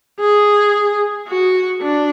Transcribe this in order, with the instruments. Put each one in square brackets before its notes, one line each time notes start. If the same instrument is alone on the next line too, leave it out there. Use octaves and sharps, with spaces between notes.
[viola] G#4
F#4
D4